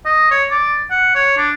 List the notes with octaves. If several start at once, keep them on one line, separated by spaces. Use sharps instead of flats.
D#5
C#5
D5
F#5
C#5
D4